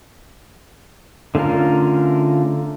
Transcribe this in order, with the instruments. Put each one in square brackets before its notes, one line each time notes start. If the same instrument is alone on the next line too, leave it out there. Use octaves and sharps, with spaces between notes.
[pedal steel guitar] D3 A3 C#4 F4 A#4